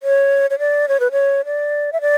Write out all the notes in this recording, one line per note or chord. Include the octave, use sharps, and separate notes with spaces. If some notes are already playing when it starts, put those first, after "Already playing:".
C#5
C#5
D5
C#5
B4
C#5
D5
E5
D5